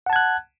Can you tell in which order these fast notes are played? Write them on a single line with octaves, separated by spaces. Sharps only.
F#5 A5 G#6 F#6